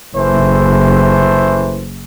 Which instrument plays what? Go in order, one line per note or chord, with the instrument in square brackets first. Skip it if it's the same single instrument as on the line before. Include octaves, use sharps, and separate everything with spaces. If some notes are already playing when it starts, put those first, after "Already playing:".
[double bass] F#1 [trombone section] E3 A3 C5